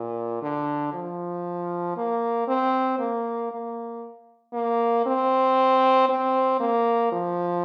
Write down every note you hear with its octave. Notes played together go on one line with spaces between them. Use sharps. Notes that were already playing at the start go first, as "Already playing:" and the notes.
Already playing: A#2
D3
F3
A#3
C4
A#3
A#3
A#3
C4
C4
A#3
F3